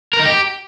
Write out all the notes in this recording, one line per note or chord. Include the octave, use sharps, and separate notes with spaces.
A#4
D#4
G4